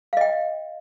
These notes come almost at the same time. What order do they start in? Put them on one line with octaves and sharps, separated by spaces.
F5 D#5 G5